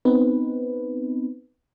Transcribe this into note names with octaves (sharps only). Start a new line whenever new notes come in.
B3 C4 D#4 B4